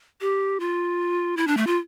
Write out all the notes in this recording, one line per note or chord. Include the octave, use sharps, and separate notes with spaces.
G4
F4
E4
D4
A3
F4